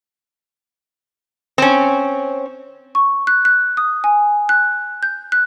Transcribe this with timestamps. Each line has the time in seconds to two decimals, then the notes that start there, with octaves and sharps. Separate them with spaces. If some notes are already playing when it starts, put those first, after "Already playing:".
1.58 C4 C#4
2.95 C#6
3.27 F#6
3.45 F#6
3.77 D#6
4.04 G#5
4.49 F#6
5.03 G6
5.32 F#6